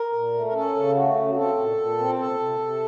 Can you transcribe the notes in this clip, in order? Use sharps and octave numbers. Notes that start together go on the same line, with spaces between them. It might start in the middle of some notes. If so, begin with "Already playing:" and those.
Already playing: A#4
A#2
A3
A#4
C#4 A4
C#3
A3 F#4
C#3
F#4
C4 A4
A#2
A#2
C4
C3 A4
C3
C3